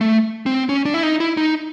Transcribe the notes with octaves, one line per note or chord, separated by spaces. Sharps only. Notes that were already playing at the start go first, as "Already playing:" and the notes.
A3
C4
C#4
D4
E4
D#4
E4
D#4